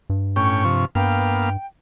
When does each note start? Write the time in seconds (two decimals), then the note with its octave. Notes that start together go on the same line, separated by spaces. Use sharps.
0.10 G2
0.36 A2 C#4 G5 C#6
0.64 C3 F3
0.95 G2 A#3 B3 F5 G5